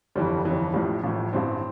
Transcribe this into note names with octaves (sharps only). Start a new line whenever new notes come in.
G1 F2 E3 G3
G1 F2 E3
A1 A2 F3 G3
A1 A2 F3
A1 G2 E3 C4